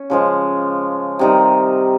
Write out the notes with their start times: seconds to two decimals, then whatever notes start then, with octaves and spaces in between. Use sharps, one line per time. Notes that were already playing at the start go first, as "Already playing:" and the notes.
Already playing: C#4
0.10 C#3 F3 G#3
1.19 C3 D#3 G3